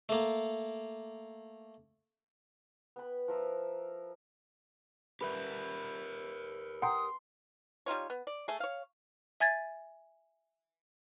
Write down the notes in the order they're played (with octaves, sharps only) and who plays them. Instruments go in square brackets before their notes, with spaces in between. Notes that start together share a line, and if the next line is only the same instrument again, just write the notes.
[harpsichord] A3 A#3
[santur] B3 G5 B5
F3 A#4 E5
[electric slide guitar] G4 A#4 E5 [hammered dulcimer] B4
[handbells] F#5 G5 A#5 [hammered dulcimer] C6 [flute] D#6
[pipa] G3 D#4 F4 C#5
B3
D5
A3 G#4
C#5 F5
[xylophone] E5 G#5 G#6 A6